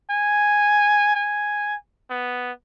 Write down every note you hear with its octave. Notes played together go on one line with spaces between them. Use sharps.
G#5
G#5
B3